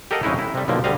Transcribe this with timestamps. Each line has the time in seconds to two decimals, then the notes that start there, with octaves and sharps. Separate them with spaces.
0.11 G4 A4 A#4 D#5 F5 F#5
0.23 F2 C#3 G#3 D#4 E4
0.39 E4
0.55 C3 G3
0.68 B1 D3 F3 A#3
0.84 D2 D3 G3 D#5 F5